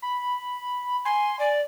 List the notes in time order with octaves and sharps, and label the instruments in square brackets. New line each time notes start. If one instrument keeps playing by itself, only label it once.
[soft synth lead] B5
[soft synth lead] G#5 [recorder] C6
[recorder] D5